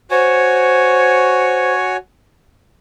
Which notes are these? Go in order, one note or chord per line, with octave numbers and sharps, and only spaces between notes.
F#4 C5 C#5 G#5